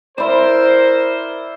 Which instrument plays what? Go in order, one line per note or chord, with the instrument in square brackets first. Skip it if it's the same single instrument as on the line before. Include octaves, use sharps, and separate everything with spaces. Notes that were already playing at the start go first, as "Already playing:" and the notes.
[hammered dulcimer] E4 D5 [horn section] A#4 C5